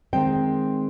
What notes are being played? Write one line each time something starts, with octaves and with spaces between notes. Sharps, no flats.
D#3 G#3 C4 G5